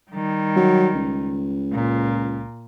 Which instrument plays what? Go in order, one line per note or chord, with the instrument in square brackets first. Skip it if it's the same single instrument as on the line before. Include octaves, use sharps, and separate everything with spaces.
[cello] D#3 G3
[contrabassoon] F#3
C#2
[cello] A#2